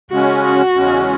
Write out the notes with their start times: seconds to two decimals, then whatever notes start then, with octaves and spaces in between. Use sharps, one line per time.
0.11 C#3 G#3 C#4 F#4
0.43 F#4
0.75 E2 C#3 G#3 C#4